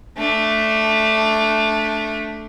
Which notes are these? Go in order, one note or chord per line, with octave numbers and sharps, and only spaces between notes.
A3 D4